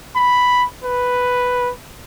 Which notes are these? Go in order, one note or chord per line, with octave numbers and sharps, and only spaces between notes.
B5
B4